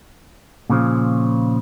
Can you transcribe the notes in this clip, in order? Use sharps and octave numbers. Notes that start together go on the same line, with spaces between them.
A#2 C#3 F3